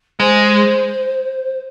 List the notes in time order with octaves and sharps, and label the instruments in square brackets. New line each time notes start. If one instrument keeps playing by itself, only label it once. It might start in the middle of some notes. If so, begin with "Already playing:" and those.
[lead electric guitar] G#3 [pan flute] C5